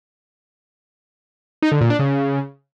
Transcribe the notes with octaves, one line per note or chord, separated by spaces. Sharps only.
D#4
D3
A#2
D4
C#3